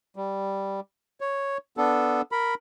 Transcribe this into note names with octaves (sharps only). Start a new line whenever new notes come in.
G3
C#5
B3 D4 A4
A#4 B5